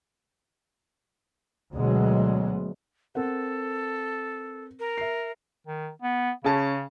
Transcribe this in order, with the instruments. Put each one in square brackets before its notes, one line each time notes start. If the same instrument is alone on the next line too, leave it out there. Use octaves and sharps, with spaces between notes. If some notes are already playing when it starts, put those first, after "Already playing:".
[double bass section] D2 B2 F#3 G#3
[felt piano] C4 A#4 F#5 [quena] A4
[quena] A#4
[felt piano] E5 C7
[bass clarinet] D#3
B3
[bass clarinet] C#3 [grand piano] C#4 G#4 A5